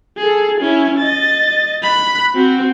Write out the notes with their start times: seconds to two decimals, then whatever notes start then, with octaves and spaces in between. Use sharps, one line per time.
0.17 G#4 A4
0.60 C#4 E4
0.98 D#5 A6
1.82 B5 F#6
2.35 C4 F#4